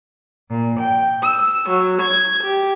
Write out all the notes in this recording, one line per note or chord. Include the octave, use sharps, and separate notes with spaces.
A#2
G5
E6
F#3
G#6
G4